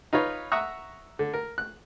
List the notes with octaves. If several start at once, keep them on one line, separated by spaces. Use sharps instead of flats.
D#4 F4 B4 C#5
E5 F#5 A#5 C#6 D#6
D3
A#4
F#6